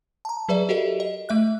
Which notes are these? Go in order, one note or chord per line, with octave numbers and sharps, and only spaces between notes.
A5 A#5
F#3 G#4 B4 D5 E5
F#4 G4 A4 A#4 D#5 E5
D#5
A3 E5 F#6